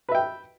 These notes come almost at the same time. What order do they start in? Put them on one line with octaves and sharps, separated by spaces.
B4 E5 G5